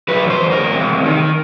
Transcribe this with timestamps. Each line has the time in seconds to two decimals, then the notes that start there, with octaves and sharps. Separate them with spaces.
0.08 F#3 B4
0.25 E2
0.30 C5
0.41 E2
0.51 A#4
0.57 E2
0.73 C3
0.89 E2
1.06 D#3